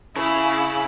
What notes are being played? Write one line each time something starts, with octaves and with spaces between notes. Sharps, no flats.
C#3 E4